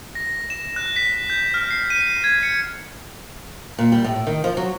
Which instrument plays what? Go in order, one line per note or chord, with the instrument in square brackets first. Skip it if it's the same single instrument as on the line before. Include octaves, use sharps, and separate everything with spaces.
[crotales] A#6
E7
F#6
B6
G6
F6
C7
D#7
G#6
C#7
[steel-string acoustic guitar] A#2
G3
A2
D#3
F3
F#3